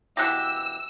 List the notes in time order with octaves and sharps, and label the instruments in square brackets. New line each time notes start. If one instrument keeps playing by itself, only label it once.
[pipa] B2 E3 G4 [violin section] E6 [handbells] F#6 A#6